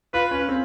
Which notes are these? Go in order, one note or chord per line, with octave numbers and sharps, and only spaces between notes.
F4 B4
C#4
C4